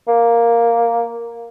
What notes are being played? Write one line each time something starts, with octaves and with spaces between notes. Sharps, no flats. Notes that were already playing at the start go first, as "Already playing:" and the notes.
A#3